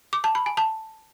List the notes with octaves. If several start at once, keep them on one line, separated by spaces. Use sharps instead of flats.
D6
A5
B5
G#5
A5